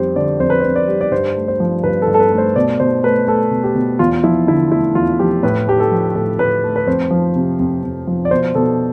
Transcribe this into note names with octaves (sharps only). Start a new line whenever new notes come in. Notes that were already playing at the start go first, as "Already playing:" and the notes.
Already playing: F2 G3 C5
D3 D5
F2 C5
B4
C5
F2
D5
G3
D5
G2 C5
A3
C5
F3
G2 B4
A4
G2
A4
B4
A3
C5
B2 D5
B2 C5
A3 B4
A3 A4
B2
G4
B2
E2 F4
F3 E4
D3 E4
A3 E4
E2 F4
F3 G4
A2 B4
A3 G4
A4
F3
A2 A4
A2 B4
A3
B4
F2 C5
F3
C3
F2
F2
F3
D5
B2 C5
B2 A4